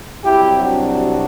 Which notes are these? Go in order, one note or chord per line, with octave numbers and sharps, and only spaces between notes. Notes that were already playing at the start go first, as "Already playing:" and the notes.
C2 C3 F#3 C4 E4 G4
D4 F#4